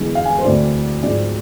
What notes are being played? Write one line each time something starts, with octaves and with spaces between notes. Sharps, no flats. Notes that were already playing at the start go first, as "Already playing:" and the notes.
Already playing: E1 E2 D3 G#3
F5
G#5
C5
D2 D3 A3 C4 D5
G#2 F3 G#3 C4 D5